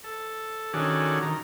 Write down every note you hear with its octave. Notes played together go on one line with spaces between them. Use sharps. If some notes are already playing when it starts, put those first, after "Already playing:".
A4
D#3 C#4 D4 F#4 G#4 A4
D#3 A#5